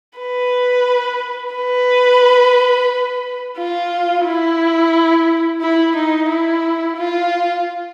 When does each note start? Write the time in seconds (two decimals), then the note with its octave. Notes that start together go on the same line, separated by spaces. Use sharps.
0.19 B4
1.54 B4
3.58 F4
4.26 E4
5.61 E4
5.96 D#4
6.29 E4
6.97 F4